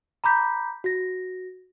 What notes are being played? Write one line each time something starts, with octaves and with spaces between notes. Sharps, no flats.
A#5 B5 D6 G6 B6
F#4 A#6